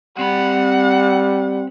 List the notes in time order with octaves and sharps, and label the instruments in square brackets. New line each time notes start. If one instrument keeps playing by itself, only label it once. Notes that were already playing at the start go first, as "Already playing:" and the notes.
[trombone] G3 [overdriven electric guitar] C4 B5 [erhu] F#5